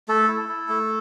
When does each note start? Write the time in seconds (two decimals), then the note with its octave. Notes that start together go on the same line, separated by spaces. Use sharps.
0.08 A3 A4
0.28 E4
0.49 E4
0.69 A3